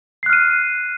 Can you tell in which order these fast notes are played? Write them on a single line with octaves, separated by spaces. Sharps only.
C7 F#6 F6 D#7